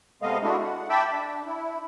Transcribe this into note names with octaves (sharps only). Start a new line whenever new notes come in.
C3 G#3 A3 B3 D#5 F5
G#3 A3 D4 E4 F#4
F#5
E5 G5 A5 B5 D6 E6
D4
E4